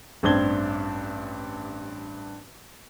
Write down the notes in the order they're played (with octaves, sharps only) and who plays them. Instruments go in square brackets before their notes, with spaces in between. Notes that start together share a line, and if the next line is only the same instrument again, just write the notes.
[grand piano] A1 G2 C4 D4 G#6 G7